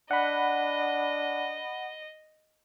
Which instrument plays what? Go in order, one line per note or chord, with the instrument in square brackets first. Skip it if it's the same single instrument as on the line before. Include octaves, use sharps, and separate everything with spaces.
[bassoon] D4 [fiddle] D#5 [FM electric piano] F#5 B5